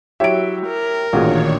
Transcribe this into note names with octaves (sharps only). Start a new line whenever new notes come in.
F#3 E4 G4 C#5 E5 D7
A#4
A1 A#2 D#3 D4 F4 F#4 G#4 C#5